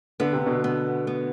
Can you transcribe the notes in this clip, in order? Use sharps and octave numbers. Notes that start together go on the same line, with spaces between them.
D3 B3
C3
B2 D3
B3
B3